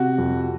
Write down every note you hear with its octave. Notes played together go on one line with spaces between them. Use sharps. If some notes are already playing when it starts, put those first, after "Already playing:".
Already playing: C3 F#4
F2